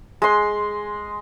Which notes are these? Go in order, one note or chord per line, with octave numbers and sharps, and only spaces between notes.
G#3 C6